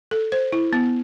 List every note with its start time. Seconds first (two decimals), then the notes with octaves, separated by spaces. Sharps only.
0.11 A4
0.32 C5
0.52 E4
0.73 B3